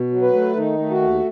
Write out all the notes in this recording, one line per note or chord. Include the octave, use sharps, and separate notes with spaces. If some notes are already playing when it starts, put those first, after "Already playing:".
Already playing: B2
F#3
B4
A3
D#3 D#4
A3
F#4
D#2